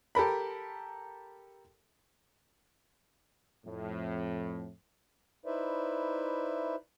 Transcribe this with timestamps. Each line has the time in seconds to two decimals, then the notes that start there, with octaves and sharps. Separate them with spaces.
0.15 G4 A4 A#4 B5
3.66 F2 A2
5.46 D#4 E4 B4 C5 D5 E5